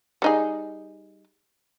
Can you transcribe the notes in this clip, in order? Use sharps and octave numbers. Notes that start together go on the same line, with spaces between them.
G3 D#4 G#4